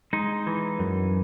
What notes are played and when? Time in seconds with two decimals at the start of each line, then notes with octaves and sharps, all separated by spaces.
0.13 G#3 D#4
0.47 E3
0.79 F#2